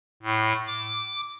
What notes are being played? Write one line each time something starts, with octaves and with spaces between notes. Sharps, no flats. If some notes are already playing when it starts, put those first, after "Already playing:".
A2
D6